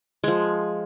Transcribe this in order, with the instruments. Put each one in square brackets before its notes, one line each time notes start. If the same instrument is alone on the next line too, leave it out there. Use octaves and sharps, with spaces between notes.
[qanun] F3 G#3